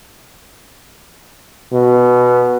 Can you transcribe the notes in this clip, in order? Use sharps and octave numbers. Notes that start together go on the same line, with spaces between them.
B2